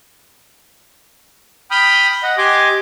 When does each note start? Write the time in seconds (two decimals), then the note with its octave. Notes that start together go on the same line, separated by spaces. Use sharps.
1.71 G5 B5 D#6 F6 G6
2.23 D#5 F#5
2.38 G4 D#5 G#5 C6 D6